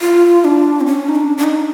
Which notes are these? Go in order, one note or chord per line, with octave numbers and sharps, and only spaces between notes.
F4
D4
C4
C#4
D#4
D4
D4
D#4